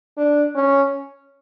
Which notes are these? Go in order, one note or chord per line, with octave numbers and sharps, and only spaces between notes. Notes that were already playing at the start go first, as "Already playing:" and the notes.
D4
C#4